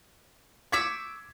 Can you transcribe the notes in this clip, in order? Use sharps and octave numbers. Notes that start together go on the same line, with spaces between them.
C#6 D6 E6 G#6 B6